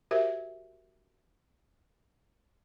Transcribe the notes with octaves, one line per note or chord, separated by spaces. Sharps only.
F#4 G4 A#4 C5 E5